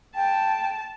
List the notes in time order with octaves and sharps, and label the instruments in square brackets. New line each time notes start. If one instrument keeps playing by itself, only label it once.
[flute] G5 [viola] A5